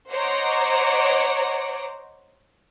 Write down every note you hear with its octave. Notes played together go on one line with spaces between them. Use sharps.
C5 C#5 D#5 F#5 A#5 D6